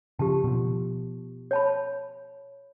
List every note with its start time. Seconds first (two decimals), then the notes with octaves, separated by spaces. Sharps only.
0.19 C#3 F3 G4 A5
0.44 B2 F3
1.51 C#5 A5 B5